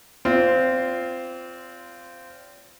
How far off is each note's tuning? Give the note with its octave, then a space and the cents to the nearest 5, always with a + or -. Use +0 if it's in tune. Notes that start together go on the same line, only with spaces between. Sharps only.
C4 -15 F4 -10 D5 -45